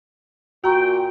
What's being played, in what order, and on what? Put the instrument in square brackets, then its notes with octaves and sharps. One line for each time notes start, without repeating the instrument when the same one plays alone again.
[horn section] A#2 G5 [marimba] F#4 A#5 C#6